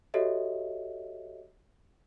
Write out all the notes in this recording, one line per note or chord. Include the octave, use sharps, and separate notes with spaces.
F#4 G4 A4 C#5 D#5 E5